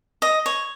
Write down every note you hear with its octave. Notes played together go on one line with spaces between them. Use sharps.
D#5
C#5